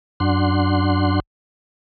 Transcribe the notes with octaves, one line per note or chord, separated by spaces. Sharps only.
F#2 D4 F#5 C6